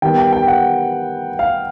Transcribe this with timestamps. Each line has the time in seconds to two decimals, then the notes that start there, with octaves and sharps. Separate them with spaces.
0.02 D#3 G3 B3 G5
0.18 G5
0.33 G5
0.48 F#5
1.39 F5